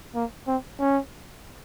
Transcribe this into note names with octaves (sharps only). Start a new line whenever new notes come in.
A#3
C4
C#4